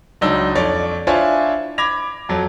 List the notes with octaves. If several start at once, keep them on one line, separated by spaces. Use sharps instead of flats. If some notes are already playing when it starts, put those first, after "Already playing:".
C#2 F#3 D4 D#4 E6 G7
F2 C#5 D5 A6
D4 E4 F4 C5 C#5 G#5
B5 D6 G#6 A#6 F7
F2 F#3